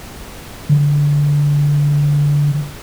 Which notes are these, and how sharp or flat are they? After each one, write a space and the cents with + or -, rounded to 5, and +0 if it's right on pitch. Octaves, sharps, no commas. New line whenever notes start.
D3 -15